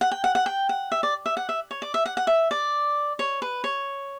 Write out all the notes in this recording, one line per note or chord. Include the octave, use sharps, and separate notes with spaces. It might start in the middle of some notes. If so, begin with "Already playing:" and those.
F#5
G5
F#5
F#5
G5
F#5
E5
D5
E5
F#5
E5
C#5
D5
E5
F#5
F#5
E5
D5
C#5
B4
C#5